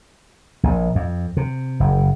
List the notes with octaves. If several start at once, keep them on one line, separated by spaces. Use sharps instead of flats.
A#1
F2
C3
F#1